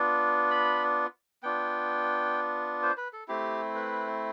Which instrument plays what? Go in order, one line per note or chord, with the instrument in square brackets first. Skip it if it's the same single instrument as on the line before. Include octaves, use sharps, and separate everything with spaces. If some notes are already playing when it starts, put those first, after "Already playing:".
Already playing: [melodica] B3 D4 F4
B5
B3 D4 F4 G5
C5
B4
A4
A3 C4 E4 G4
B4